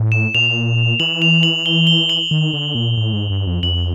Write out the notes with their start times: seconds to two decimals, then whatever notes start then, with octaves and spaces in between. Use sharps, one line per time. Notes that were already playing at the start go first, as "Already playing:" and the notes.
Already playing: A2
0.12 E7
0.35 A#2 F7
1.00 E3 F#7
1.22 F7
1.43 F#7
1.66 G7
1.87 G7
2.09 F#7
2.31 D#3
2.53 D3
2.75 A#2
2.97 A2
3.13 G#2
3.30 G2
3.47 F2
3.63 F2 F#7